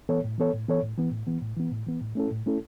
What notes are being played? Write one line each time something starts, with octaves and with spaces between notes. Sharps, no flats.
E3 B3 A4 C#5
A2
E3 B3 A4 C#5
A2
E3 B3 A4 C#5
A2
E3 B3
A2
E3 B3
A2
E3 B3
A2
E3 B3
A2
A3 C#4 E4 A4
A2
A3 C#4 E4 A4